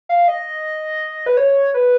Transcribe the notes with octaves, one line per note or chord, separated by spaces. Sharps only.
F5
D#5
B4
C#5
B4